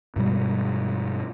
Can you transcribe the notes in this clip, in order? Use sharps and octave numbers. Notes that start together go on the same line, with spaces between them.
G2 B2 G3 G#3